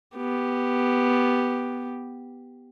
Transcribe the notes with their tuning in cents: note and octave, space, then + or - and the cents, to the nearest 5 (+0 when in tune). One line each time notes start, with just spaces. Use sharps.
B3 +0 G4 +0